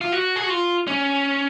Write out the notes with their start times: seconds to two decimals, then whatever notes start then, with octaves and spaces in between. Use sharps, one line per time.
0.01 F4
0.12 F#4
0.36 G#4
0.44 F#4
0.50 F4
0.87 C#4